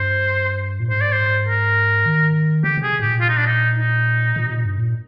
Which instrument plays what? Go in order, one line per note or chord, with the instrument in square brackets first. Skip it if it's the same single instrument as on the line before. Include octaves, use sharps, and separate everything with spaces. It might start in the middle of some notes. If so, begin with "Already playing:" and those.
Already playing: [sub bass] G2 [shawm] C5
[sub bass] A#2
[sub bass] G#2 [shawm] C5
[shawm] D5
C5
A#4
[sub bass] D#3
[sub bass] D3 [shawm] G4
[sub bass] C3
[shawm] G#4
[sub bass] G#2 [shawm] G4
[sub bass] A#2
[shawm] F4
D#4
D4
D#4
D#4
[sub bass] A#2
C3
A#2
G2
A#2